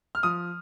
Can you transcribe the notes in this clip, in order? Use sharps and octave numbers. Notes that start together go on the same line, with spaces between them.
F6
F3 D#6